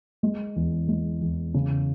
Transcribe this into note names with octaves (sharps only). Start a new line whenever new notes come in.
G#3
E2
G#3
E2
C#3